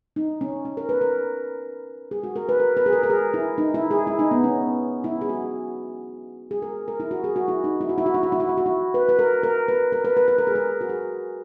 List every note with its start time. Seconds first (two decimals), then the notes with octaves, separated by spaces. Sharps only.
0.16 D#4
0.41 C#4
0.65 C#4
0.77 A#4
0.89 B4
1.01 A#4
2.11 G#4
2.24 F#4
2.36 A#4
2.49 B4
2.60 A#4
2.77 B4
2.86 G#4
2.93 A#4
3.03 A#4
3.10 G#4
3.34 E4
3.58 D#4
3.74 E4
3.91 G#4
4.07 E4
4.19 D#4
4.31 B3
4.44 C#4
5.04 E4
5.21 G#4
5.29 F#4
6.51 G#4
6.62 A#4
6.88 A#4
7.00 E4
7.11 F#4
7.24 G#4
7.36 F#4
7.48 E4
7.64 D#4
7.81 E4
7.89 F#4
7.98 E4
8.06 F#4
8.14 E4
8.23 F#4
8.32 E4
8.40 F#4
8.49 E4
8.58 F#4
8.66 E4
8.94 B4
9.09 B4
9.19 A#4
9.43 A#4
9.68 B4
9.92 A#4
10.05 B4
10.17 B4
10.28 B4
10.38 A#4
10.47 G#4
10.55 A#4
10.81 F#4
10.89 G#4